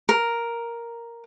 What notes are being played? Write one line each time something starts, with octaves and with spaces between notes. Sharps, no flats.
A#4